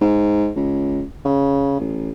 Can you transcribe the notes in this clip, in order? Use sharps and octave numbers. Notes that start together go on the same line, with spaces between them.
G#2
C#2
C#3
A1